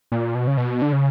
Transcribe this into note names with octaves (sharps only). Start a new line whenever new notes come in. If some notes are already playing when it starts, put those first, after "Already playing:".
A#2
B2
C#3
B2
D3
C#3